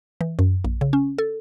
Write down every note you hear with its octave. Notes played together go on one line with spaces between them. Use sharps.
E3
F#2
A#1
C#3
C#4
A4